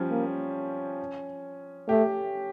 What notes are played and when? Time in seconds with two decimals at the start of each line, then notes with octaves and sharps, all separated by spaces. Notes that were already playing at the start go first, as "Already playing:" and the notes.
Already playing: F3 G3 C#4
0.11 A#3
1.89 A3 G4